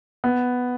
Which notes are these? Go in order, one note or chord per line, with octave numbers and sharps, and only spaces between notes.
B3